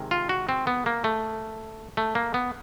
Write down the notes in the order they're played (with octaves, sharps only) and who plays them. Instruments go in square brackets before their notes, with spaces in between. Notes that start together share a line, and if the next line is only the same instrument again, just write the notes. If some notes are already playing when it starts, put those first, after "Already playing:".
Already playing: [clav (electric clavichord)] C3 D#3 G#3
F4
F#4
C4
B3
A#3
A3
A3
A#3
B3